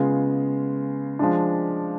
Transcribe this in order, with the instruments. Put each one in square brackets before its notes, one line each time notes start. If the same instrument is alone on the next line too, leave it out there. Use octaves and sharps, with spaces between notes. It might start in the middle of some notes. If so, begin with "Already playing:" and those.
Already playing: [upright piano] C#3 G#3 B3 F4
F3 G#3 D4